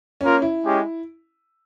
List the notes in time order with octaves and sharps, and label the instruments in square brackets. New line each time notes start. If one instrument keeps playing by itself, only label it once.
[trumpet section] A#3 F4 A#4 [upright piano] C#4
[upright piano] E4
[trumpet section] G#3 C#4 G4